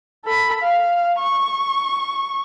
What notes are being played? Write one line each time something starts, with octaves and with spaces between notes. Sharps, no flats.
A4 B5
F5
C#6